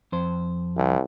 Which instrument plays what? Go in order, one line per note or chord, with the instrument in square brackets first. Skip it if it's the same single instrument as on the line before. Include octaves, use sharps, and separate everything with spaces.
[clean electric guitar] F2 C5
[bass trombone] C2